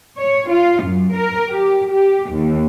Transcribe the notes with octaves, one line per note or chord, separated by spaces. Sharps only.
C#5
F4
F#2
A#4
G4
G4
D#2